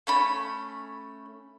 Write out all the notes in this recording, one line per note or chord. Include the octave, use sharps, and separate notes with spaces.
A3 C#4 B5